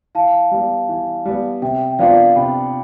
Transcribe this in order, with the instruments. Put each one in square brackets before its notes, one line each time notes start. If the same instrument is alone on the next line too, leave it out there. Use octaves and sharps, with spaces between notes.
[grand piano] E3 [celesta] F5 A5
[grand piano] G3 B3
E3
G3 B3
[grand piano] C3 [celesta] E5 G5
[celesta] G5
[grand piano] F3 B3 D4 F4 [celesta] D5 F5
[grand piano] C3 [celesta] G5 B5